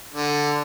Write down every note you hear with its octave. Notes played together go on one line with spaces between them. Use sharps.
D3